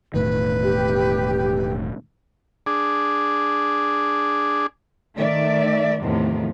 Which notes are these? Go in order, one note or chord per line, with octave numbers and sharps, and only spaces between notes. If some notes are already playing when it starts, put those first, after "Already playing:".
E1 A2 D#3 B4
G4
D4 G#4
D#3 A3 D5 E5
E2 A2 C3 D#3 F3 A3